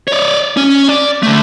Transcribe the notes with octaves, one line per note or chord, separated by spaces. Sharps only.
C#5 D5
C#4
D5
D3 A3